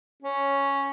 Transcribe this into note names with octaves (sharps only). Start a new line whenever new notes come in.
C#4